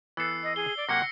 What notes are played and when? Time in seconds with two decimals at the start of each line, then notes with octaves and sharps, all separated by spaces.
0.17 E3 B3 A4 E6 C7
0.43 D#5
0.56 G#4 G7
0.77 D5
0.89 C3 F#3 A#3 F#5 A#6 C#7